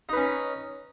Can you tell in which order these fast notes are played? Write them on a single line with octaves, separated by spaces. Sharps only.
D#4 B4 C#4